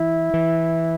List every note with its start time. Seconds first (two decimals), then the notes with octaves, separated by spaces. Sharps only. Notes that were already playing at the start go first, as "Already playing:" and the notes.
Already playing: E3 E4
0.34 E3